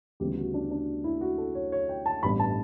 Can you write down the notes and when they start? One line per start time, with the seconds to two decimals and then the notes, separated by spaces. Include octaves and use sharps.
0.20 D2 C#3 E3 G3 B3 G4
0.37 F#4
0.54 D4
0.71 D4
1.04 E4
1.21 F#4
1.38 A4
1.55 C#5
1.72 C#5
1.89 G5
2.06 A5
2.23 A1 G2 E3 G3 B3 B5
2.39 A5